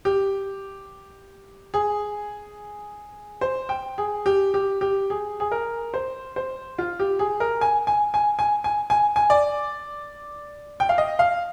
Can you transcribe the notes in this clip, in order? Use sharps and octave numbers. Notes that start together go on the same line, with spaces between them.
G4
G#4
C5
G5
G#4
G4
G4
G4
G#4
G#4
A#4
C5
C5
F4
G4
G#4
A#4
G#5
G#5
G#5
G#5
G#5
G#5
G#5
D5
G5
F5
D#5
F5